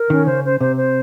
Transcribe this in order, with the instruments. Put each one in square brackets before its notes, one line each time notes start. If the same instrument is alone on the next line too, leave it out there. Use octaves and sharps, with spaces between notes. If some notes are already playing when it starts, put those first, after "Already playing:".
Already playing: [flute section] A#4
[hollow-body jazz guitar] D#3 [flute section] C#4
[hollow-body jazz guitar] C#3 [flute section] C5
[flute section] C5
[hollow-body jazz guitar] C3 [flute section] C5
[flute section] C5